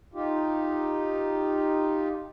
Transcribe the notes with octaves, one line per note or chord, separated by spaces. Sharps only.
D#4 F4 G4